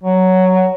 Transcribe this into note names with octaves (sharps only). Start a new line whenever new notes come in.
F#3